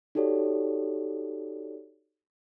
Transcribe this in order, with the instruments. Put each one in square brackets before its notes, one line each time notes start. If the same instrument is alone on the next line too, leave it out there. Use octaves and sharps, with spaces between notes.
[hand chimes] D#4 F#4 G4 A4 C#5 D5